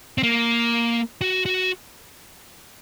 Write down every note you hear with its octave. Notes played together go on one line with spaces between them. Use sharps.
C4
A#3
F#4
F#4